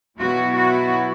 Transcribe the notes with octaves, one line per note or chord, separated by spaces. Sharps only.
B2 F#3 B3 E4 F#4
F#4